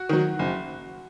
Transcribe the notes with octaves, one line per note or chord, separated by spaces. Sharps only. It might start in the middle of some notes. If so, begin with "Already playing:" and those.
Already playing: F#4
D#3 F#3
F#1